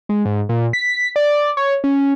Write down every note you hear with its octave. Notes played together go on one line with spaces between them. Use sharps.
G#3
G#2
A#2
B6
D5
C#5
C#4